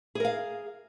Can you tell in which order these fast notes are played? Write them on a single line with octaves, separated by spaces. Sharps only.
G#4 A#4 F5